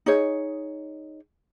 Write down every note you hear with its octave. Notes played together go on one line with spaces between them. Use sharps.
D#4 G#4 C#5